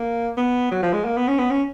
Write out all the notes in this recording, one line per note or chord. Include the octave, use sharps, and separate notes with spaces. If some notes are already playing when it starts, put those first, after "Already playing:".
Already playing: A#3
B3
F#3
F3
G#3
A#3
B3
C#4
B3
C#4